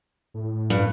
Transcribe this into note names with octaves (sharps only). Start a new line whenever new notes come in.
A2
G2